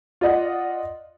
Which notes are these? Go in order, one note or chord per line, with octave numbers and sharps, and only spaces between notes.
F4 D5 D#5 F#5